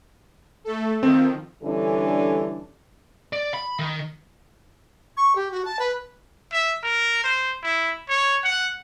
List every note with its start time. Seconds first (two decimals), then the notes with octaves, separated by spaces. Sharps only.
0.64 A3 A4
1.03 D#3 F3 C4
1.63 D3 E3 G3 C#4 D4 A4
3.33 D5
3.54 B5
3.79 D#3
5.17 C#6
5.35 G4
5.52 F#4
5.65 A5
5.79 B4
6.53 E5
6.83 A#4
7.24 C5
7.63 E4
8.09 C#5
8.44 F#5